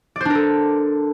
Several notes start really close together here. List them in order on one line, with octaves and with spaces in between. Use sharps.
D5 C5 D4 A#4 A4